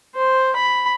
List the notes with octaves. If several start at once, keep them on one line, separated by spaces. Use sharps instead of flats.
C5
B5